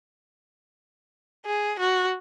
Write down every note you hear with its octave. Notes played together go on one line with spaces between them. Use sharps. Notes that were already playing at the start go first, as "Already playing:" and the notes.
G#4
F#4